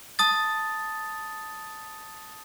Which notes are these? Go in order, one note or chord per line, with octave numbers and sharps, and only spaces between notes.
A5 D#6 A6